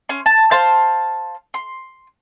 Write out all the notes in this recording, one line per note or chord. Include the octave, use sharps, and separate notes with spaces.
C#4 C6
A5
C5 F5 A5 C6
C6